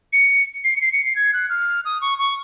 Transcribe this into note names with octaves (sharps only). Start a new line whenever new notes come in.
C#7
C7
C#7
C7
C#7
C7
G#6
F#6
F6
D#6
C#6
C#6